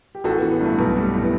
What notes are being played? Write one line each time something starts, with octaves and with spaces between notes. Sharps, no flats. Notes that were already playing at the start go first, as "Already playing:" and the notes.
G4
A1 F#4 A4
E3 B3
B3
G2 A3
B1 B3
G3
A2
B3